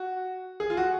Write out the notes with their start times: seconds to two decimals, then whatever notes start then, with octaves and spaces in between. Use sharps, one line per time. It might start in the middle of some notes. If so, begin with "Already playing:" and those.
Already playing: F#4
0.60 G#4
0.70 F4
0.77 F#4